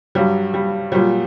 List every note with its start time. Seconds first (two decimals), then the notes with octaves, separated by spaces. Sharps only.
0.15 G2 F#3 G3
0.54 G3
0.92 A#2 F#3 G3